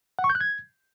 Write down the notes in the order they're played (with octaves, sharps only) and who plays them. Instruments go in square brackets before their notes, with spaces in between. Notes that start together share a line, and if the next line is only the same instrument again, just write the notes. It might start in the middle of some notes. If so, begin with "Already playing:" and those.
[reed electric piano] F#5
C#6
G6
F#6
G#6